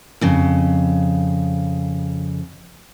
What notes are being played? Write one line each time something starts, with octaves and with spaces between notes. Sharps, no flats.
F2 C#3